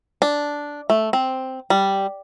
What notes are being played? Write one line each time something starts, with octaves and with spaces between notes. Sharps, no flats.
D4
A3
C4
G3